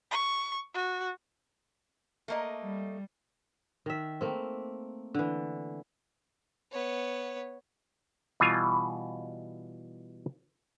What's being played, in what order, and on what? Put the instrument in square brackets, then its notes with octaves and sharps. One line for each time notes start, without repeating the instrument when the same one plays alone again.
[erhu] C#6
F#4
[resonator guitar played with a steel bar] A3 A#3 D#5
[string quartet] G3
[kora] D#3 E5
A3 A#3 C4
D3 E3
[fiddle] B3 C#5
[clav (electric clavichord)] B2 E3 G3 F4 G#5 A#5